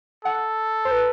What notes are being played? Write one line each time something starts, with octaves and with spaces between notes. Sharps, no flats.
A4 F#5
C5
B4